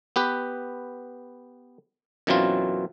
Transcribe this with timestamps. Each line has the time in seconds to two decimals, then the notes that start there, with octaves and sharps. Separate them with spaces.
0.16 B3 G4 B4
2.27 F#2 B2 E3 F#3 C4 F4